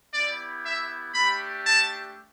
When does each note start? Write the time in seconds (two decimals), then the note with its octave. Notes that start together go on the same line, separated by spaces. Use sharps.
0.13 B3 E4 G4 D5
0.64 E5
1.14 A3 D4 G4 B5
1.65 A5